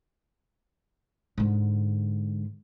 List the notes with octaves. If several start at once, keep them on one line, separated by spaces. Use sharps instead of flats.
G#2 D3